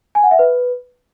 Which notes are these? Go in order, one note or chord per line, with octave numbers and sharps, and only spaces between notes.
G#5
F#5
E5
B4